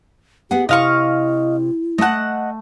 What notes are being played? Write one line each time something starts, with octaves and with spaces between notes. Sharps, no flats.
B3 G4 G#4 F#5
C3 E4 D#5 F5 C#6
A3 D#5 F#5 A5